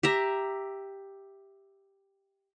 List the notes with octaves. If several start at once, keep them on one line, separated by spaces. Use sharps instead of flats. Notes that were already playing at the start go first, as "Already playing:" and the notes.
G4 E5 A#5